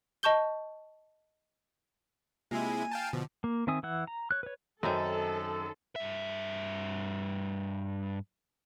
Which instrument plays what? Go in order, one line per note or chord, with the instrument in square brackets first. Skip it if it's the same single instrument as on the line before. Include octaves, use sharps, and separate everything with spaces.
[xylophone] D#5 A5 C#6 G6 G7
[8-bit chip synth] C3 G#3 E4 [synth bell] A#3 F4 [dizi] G#5
[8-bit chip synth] F5 G5 A5
[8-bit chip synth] B2 F3 [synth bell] D3
[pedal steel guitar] A#3
D#3 C4 E5 G#5 D#6
E3 E4 F#5
A#5
C#5 F#6
B4 C#5
[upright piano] F#2 [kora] D#3 C4 C#4 [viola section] A4
[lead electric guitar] G2 E5